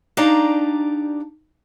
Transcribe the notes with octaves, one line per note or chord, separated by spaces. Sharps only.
D4 D#4 G4 D5 F5 A#5